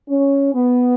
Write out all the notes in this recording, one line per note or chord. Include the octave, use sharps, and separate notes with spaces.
C#4
B3